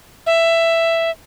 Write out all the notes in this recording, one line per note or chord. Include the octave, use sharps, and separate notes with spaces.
E5